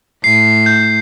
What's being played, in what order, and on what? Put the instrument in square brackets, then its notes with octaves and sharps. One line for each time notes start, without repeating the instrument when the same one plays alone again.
[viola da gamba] A2 [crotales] C7
[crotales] G6